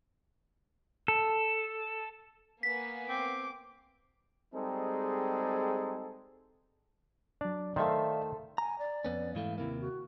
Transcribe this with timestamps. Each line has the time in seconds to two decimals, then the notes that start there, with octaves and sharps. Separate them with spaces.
1.08 A4
2.63 A#3 B3 G#5 B6
3.09 C4 D6
4.53 G3 G#3 C4 D#4 G#4 A4
7.41 F#3 D4 D5
7.76 D#3 A3 A4 C5 D5 E5 F5
8.58 G#5 A#5
8.79 D5
9.05 F2 B3 C#4
9.35 G#2 E3 A3 F5
9.58 D#2 C3 A#3 E4
9.81 F#4